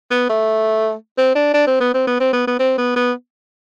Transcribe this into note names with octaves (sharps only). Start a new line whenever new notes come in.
B3
A3
C4
D4
D4
C4
B3
C4
B3
C4
B3
B3
C4
B3
B3